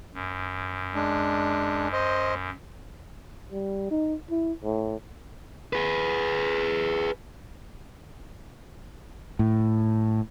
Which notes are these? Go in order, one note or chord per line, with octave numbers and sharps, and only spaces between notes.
F#2
G#3 D4
C5 D#5
G3
D#4
E4
A2
G#4 B4
A2